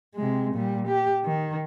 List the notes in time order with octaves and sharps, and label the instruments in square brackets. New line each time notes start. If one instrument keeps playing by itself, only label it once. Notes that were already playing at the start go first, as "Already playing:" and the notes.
[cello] C3 G#3
A#2 G3
G4
D#3